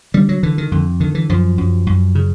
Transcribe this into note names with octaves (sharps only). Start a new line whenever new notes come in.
D3 G3
F#3
D3 E3
D#3
F2 D3
D3 D#3
E3
F#2 F3
F#2
F#2
C#3